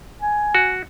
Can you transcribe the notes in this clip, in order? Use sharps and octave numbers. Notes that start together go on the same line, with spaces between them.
G#5
F#4